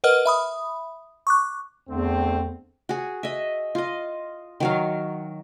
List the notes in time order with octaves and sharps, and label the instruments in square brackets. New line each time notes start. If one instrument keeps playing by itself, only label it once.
[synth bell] A#4 B4 D#5 F#5 F6
E5 B5 D#6
C#6 D6 F#6
[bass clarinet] E2 [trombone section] D3 A3 C4
[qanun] F#4 G#4
D#5 E5
F4 D#5
D#3 F#3 F5